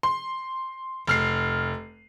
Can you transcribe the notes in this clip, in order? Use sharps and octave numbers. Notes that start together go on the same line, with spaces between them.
C6
F1 F6 C7